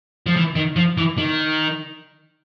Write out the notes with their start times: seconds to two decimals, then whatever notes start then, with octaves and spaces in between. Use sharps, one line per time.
0.26 F3
0.36 E3
0.56 D#3
0.76 F3
0.98 E3
1.18 D#3